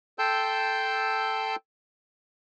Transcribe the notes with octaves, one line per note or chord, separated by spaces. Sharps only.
A4 G5 A5 C6 E6 G6